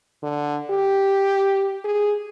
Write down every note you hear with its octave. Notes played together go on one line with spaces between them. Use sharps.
D3
G4
G#4